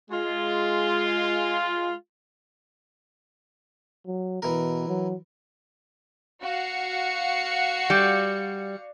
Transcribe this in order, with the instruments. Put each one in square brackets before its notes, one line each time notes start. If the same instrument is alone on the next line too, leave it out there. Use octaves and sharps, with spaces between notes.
[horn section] G#3 F4
[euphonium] F#3
[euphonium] B2 [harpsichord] E3 A#4
[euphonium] F#3
[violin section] F#4 F5 C#7
[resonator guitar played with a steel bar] G3